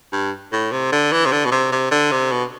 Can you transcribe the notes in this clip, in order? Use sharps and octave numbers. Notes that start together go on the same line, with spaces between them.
G2
A2
C3
D3
E3
C3
D3
B2
C3
C3
D3
C3
B2